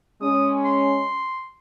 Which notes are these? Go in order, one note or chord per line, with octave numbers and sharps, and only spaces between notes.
G#3 C#4 D#6
C6